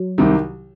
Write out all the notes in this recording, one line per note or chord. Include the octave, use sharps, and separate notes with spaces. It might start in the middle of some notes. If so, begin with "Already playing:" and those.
Already playing: F#3
C2 C3 D#3